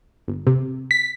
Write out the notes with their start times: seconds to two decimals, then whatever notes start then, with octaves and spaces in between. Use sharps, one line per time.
0.28 G1
0.47 C3
0.91 B6